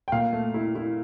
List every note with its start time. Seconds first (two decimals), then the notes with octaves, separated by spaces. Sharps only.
0.08 G5
0.12 A#2 F5
0.33 A3
0.54 E4
0.75 E4